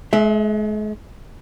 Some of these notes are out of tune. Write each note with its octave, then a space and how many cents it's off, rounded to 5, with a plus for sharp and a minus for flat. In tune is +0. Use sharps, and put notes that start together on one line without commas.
G#3 +40 E5 +0